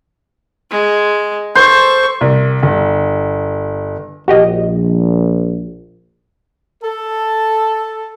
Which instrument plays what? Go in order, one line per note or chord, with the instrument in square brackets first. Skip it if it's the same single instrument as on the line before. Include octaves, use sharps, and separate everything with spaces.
[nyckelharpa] G#3
[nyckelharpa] A4 C#6 [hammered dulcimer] C5
[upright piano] C2
G1
[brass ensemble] A#1 [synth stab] F#4 G4 D#5
[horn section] A4